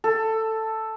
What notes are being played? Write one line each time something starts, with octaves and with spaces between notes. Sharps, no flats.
A4